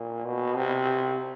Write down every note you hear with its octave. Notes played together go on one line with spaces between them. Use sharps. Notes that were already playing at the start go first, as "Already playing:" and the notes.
Already playing: A#2
B2
C3